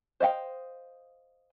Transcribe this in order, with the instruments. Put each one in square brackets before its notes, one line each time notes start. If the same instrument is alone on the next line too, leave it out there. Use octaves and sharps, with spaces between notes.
[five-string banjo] C5 D#5 F5 G5